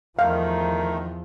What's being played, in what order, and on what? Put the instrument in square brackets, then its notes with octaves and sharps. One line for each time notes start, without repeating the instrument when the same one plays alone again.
[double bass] E2 F3 [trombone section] D#3 [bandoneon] A3 [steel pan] F5